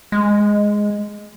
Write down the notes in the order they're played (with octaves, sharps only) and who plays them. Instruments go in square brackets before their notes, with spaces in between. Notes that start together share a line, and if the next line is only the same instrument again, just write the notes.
[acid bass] G#3